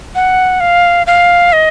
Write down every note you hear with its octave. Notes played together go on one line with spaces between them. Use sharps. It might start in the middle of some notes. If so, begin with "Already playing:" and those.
F#5
F5
F5
D#5